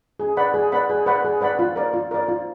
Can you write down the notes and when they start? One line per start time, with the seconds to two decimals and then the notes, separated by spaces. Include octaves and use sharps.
0.20 G#4
0.37 B4 D5 F#5 B5
0.54 G#4
0.72 B4 D5 F#5 B5
0.90 G#4
1.06 B4 D5 F#5 B5
1.24 G#4
1.41 B4 D5 F#5 B5
1.59 F4
1.76 A#4 D5
1.94 F4
2.11 A#4 D5
2.28 F4